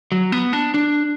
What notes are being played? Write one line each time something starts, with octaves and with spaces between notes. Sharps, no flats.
F#3
B3
D4
D4